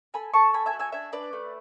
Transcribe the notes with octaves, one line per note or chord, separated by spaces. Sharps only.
A4 G#5 B5
A4 A5 C#6
A3 G#5 B5
E5 G#5
F#4
E5 G#5
D4 E5 G#5
D4 B4 D5
A3